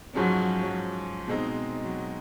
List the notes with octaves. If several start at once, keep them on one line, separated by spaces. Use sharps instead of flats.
G#2 F3 F#3 G#3 C#4
B2 G#3 C4 D#4
F#3